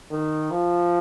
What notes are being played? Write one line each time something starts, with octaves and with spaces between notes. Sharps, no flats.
D#3
F3